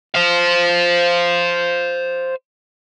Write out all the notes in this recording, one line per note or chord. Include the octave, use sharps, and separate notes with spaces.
C5 F5